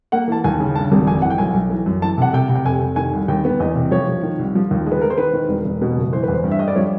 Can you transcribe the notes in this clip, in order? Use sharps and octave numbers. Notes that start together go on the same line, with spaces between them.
A#3 F#5
E3 A5
D#2 G#5
C#3
G2 A5
G#1
F2 G#5
E3 F#5
G5
B1 G#5
B1
E3
F#2
E3 A5
C3 F#5
C3 G5
C3
G5
F1 G#5
F1
D#3 G#5
C2
D#2 G5
B3
E2 D#5
C3
F3 C#5
F3
D#3
C2
F3
D#2
G#3
B4
G#3 A#4
C5
D#3 B4
D#3
E1
E1
B2
F#1
E3 C5
E2 B4
C5
G2
E5
G3 D#5
D5
F3 C#5